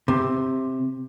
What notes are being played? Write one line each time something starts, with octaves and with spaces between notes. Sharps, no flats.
C3